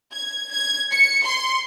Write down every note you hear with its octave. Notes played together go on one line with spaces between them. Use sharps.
G#6
G#6
C#7
C6